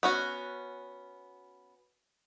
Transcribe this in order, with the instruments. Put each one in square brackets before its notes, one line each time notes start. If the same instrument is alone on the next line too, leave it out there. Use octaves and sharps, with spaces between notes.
[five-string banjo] B3 C#4 F#4